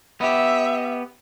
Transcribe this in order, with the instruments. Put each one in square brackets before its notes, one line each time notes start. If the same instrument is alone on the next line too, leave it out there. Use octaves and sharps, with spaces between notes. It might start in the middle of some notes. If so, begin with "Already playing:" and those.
[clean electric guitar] B3 G4 [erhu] E5